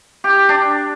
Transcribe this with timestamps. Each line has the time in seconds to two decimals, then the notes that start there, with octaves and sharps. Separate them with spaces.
0.24 G4
0.49 D4